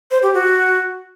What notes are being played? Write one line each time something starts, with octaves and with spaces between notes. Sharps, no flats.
C5
G4
F#4